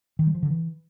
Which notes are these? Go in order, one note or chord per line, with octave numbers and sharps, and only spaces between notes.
D#3
G3
F3
D3
E3